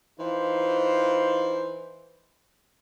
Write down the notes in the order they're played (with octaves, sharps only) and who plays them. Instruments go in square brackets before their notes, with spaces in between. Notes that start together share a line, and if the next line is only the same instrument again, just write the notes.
[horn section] E3 D#4 F4 C5